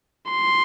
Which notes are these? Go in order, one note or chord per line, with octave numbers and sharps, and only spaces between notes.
C6